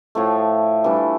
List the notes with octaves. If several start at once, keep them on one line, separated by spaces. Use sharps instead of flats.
A2 F3 A3
E3 G3 D4